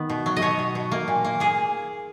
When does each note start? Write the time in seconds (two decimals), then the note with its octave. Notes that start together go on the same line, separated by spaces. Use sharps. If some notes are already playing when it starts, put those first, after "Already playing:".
Already playing: D#3 B3
0.10 B2
0.26 F#3
0.37 D#5
0.42 B2 C#5
0.59 B2
0.75 B2
0.92 A#3
1.08 A#2
1.25 A#3
1.40 A#3 G#4